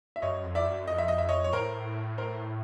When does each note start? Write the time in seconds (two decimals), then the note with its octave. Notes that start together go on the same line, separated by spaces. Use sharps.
0.16 E5
0.22 F#2 C#5 D#5
0.44 F2
0.55 D5 E5
0.65 F#2
0.87 F2 D#5
0.98 E5
1.08 D#5
1.18 E5
1.29 C#5 D#5
1.44 C#5
1.53 A2 A#4 C5
2.18 A#4 C5